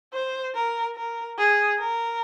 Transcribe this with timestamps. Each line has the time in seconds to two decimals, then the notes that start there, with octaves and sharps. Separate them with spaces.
0.14 C5
0.55 A#4
0.96 A#4
1.38 G#4
1.79 A#4